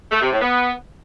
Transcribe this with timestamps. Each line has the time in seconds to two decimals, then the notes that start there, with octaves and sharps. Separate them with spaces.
0.12 A3
0.22 C3
0.31 A2
0.41 B3